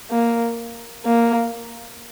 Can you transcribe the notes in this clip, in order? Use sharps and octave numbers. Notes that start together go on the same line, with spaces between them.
A#3
A#3